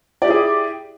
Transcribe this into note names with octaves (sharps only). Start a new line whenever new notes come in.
E4 G4 G#4 D5